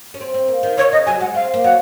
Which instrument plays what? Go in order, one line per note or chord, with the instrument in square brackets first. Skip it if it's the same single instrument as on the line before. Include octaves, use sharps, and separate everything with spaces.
[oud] C#4
C4
C4
A#3
D#3
[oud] D#3 [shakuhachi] C#5
[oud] C#3 [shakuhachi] D#5
[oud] F#3 [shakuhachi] G#5
[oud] G#3 [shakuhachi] F#5
[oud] C4 [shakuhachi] F5
[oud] A#3
[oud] F#3 [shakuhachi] F#5